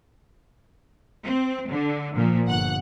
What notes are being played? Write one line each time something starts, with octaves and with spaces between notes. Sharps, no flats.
C4
D3
A#2 F3
G1 F#5 F#6